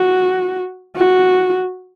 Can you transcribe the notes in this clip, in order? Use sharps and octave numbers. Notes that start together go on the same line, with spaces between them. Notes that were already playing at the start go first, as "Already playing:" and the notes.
Already playing: F#4
F#4